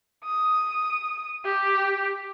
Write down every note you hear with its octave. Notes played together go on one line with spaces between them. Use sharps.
D#6
G4